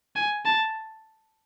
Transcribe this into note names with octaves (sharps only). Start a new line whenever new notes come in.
G#5
A5